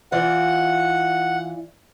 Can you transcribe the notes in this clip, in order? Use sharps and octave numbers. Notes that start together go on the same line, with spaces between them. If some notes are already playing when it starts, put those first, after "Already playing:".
E3 F4 D5 F#5